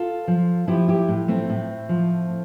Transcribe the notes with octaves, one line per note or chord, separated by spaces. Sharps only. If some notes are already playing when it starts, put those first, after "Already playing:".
Already playing: F4 A4
F3
F3 E4 G4
E4 G4
A2
A3 C4
A2
F3